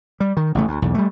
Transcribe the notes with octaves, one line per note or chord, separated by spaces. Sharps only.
G3
D#3
A1 C#3 A3
D2
B1 E2
G3 A3